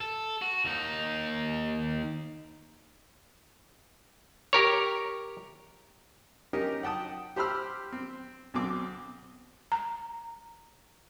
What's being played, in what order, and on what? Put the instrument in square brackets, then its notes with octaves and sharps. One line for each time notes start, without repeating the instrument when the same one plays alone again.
[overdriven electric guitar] A4
F#4
D#2 D#4
[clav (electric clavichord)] G4 A#4 C#5
[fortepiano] C#4 D#4 G4 A#4
F#5 G5 A5 D#6
G4 C5 B5 E6 F6
C4
B1 B2 C4 D6
[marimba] A#5